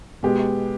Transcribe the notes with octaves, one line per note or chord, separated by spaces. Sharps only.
B2 G#3 B3 G4